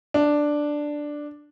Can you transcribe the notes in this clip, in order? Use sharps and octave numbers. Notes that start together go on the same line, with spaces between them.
D4